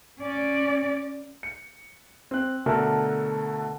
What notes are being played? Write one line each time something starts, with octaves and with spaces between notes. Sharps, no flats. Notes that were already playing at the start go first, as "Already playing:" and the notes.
C#4 D5
C#7
C4 F#6
B2 D3 A3 A4 A#4